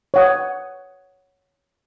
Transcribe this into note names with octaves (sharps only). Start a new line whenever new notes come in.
C#5 F#5 D#6